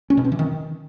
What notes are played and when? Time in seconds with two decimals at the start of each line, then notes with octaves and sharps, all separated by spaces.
0.10 C#4
0.17 B2
0.25 C4
0.32 E3
0.39 D#3